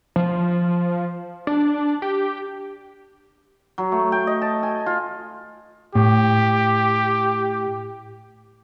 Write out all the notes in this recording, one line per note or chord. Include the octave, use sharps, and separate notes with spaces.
F3
D4
G4
F#3
A3
G5
D#5
A5
G#5
F4
A2 G4